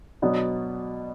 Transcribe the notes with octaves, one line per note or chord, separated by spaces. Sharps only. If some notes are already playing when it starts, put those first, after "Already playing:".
B2 F#3 B3 D4